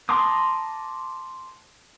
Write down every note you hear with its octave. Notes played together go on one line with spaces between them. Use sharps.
A5 A#5 C6 D6 D#6